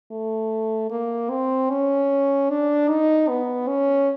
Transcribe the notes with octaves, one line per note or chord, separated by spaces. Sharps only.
A3
A#3
C4
C#4
D4
D#4
B3
C#4